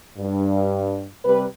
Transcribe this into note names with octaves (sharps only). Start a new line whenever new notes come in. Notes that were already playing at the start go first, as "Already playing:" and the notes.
G2
C3 G3 B4